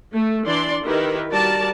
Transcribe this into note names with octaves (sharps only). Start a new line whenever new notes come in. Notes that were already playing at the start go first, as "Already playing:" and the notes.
A3
E3 D4 D5 C6
D#3 E4 G4 A#4 B4
G3 F#4 A#4 D5 A5